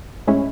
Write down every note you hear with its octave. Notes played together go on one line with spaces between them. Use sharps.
A2 G#3 C#4 E4